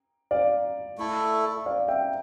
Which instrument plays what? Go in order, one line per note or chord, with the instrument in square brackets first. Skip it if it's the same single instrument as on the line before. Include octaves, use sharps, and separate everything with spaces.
[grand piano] D5 F5
[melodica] A3 E4 A4
[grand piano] D5 F5
E5 G5